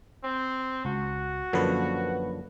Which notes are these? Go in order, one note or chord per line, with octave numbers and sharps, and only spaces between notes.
C4
C#2 F#4
F#2 D3 F3 A#3 B4